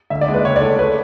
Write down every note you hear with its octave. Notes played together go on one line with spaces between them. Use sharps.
D2 E5
D5
G#3
B4
C#2 C#5
D5
A3
A3 B4